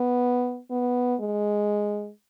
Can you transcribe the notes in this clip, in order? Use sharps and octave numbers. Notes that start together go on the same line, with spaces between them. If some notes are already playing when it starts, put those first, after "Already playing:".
Already playing: B3
B3
G#3